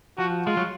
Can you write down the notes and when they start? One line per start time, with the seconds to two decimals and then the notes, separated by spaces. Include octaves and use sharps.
0.18 F3 F#4
0.46 G#3 F4
0.57 F#3